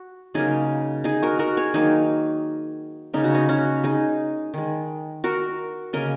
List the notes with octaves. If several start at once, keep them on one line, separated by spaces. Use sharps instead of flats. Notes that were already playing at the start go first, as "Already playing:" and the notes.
Already playing: F#4
C#3 F#3 A#3 D#4 G#4
D#4 G#4
F#4 A#4
F#4 A#4
G#4 C#5
D#3 F#3 A#3 D#4 G#4
C#3 A#3 D#4
F#4
D#4
C#4 F#4
D#4 G#4
D#3 G#3
F#4 A#4
C#3 A#3 A#4 D#5